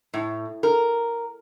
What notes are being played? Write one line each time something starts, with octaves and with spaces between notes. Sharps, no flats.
A2
A#4